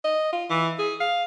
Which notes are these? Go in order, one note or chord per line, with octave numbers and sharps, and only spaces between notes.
D#5
F4
E3
G#4
F5